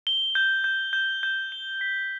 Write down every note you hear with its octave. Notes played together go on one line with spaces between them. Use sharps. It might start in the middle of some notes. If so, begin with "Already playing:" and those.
G7
G6
G6
G6
G6
G7
B6